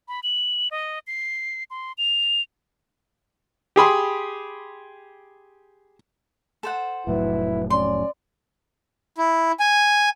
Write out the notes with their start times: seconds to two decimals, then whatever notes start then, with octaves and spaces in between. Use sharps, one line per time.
0.08 B5
0.23 F#7
0.71 D#5
1.07 C7
1.70 C6
1.98 F7
3.76 G4 G#4 B5 C6
6.63 A4 C5 F#5
7.07 F1 A2 F#3 E4 B4
7.70 C#4 D5 C6
9.18 E4
9.59 G#5